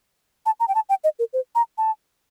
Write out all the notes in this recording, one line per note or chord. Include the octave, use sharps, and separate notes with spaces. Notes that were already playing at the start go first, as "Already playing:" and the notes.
A5
A#5
G5
A5
G5
D#5
A#4
C5
A#5
A5